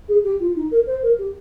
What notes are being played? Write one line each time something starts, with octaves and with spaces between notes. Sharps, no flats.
G#4
G4
F4
D#4
A#4
C5
A#4
G4